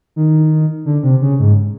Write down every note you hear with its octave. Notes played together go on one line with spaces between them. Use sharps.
D#3
D3
C3
C#3
G#2